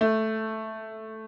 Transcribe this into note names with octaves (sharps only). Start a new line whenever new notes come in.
A3